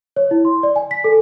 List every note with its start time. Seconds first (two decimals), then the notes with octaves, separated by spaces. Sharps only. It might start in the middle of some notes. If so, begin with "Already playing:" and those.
0.16 C#5
0.31 E4
0.45 C6
0.63 D5
0.76 G#5
0.91 B6
1.04 A4